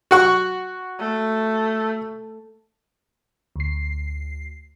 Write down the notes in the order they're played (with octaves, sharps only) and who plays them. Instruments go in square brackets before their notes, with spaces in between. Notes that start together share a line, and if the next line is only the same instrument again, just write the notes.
[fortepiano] F#4 F#5 C#6
[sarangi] A3
[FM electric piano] D2 C7